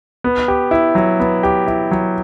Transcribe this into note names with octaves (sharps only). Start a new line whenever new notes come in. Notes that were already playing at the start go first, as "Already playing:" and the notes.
B3
G4
E4
F#3
B3
G4
E4
F#3